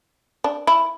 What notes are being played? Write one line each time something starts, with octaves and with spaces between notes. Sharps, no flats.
D4
E4